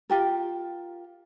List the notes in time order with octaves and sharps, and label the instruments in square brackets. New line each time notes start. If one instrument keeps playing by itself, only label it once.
[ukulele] F4 G4 A#4